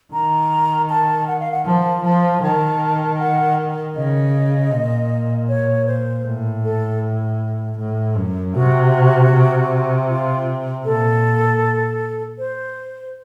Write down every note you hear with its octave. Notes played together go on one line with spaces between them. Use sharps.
D#3 A#5
A5
F#5
F5
F#5
F3 A5
F3 A5
D#3 A5
F#5
C#3 D#5
A#2
C#5
C5
A2
A4
A2
F#2
C3 F#4
C3
F4
A#2 A4
C5